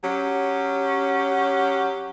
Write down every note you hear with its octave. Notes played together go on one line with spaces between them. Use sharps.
F#3 C#4 G4